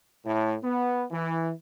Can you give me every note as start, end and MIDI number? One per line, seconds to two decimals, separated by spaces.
0.25 0.55 45
0.63 1.05 59
1.11 1.51 52